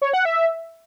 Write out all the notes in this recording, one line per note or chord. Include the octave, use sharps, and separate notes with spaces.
C#5
F#5
E5